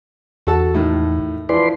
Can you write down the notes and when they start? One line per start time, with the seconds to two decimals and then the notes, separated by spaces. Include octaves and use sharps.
0.47 E2 F#4 A4 A5
0.75 A2 D#3
1.49 E3 F3 B4 D5 C6